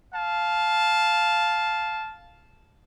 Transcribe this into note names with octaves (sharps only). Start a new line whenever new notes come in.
F5 A5